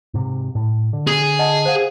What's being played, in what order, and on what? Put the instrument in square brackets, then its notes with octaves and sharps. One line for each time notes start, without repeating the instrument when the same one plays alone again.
[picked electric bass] G#2 C3
A2
D3
[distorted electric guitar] G#4
[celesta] D#5 F#5 A5
C5 F5 F#5